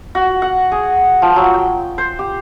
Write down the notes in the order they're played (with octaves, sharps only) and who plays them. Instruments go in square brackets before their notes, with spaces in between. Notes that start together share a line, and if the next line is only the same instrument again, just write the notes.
[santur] F#4
F#5
G#4
F3
F#3
G5
C5
G4